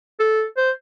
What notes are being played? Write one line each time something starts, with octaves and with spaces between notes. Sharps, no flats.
A4
C5